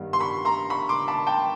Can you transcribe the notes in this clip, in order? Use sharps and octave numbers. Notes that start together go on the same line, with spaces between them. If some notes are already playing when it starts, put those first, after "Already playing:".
Already playing: G2 D#3 G3 B3
C6
B5 C#6
A#5 C6
B5 C#6
C6 D6
A5 B5
G5 A5